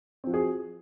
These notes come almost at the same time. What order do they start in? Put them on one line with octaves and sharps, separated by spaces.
C4 F3 F#4 G#4